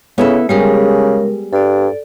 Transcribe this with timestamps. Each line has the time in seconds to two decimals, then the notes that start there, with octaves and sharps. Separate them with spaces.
0.18 C#3 B3 E4 A4
0.49 C#3 G3 G#3 G4 G#4 A#4
1.53 G2 A4 D5